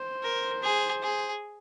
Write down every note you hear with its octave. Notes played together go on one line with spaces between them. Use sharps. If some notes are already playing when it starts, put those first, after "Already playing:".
Already playing: C5
A#4
G#4
G#4